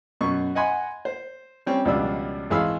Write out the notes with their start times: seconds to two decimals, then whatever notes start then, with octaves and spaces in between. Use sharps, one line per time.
0.21 F#2 B2 C#6
0.55 D#5 F#5 G#5 B5 C6
1.05 C5
1.66 G3 C4 C#4
1.85 C#2 B2 F3 G3 D4 E6
2.50 G#1 E3 G#4 F5 B5 E6